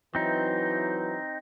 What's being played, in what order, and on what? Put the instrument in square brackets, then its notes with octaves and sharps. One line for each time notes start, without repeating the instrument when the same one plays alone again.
[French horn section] E3 F#3 [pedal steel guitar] C4 D#4